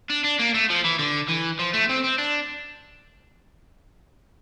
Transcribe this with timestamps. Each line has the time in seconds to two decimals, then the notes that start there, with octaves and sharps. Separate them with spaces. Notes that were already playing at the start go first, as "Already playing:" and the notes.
0.10 D4
0.24 D4
0.40 A#3
0.54 A3
0.70 F3
0.84 E3
0.99 D3
1.29 E3
1.59 F3
1.74 A3
1.89 C4
2.04 C4
2.18 D4